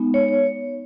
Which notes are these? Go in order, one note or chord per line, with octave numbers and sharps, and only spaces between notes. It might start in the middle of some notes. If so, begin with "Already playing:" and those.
Already playing: G#3 B3 D#4
C#5
C#5